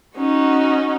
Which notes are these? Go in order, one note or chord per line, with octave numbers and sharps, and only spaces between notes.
C#4 D#4 F#4